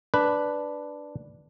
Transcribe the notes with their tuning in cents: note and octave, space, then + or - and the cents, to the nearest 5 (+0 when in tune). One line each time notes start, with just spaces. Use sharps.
D4 +0 B4 +0